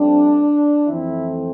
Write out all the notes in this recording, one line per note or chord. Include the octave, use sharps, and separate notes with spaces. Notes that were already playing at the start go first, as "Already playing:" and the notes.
Already playing: G2 F3 A3 C4 D4
F2 E3 A3 C4 E4